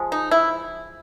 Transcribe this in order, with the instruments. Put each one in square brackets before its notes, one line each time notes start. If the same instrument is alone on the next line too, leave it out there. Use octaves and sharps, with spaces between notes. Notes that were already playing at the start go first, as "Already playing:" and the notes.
Already playing: [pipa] F3 G#3
D#4
E4